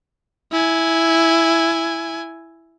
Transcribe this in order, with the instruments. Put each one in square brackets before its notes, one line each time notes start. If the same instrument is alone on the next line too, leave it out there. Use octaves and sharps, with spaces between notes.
[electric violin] E4 G#5